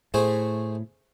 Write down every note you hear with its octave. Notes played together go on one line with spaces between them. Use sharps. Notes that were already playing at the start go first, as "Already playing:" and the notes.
A2 A3 G#4 C5